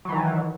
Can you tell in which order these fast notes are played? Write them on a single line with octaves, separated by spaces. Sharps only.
F#3 E3 D#3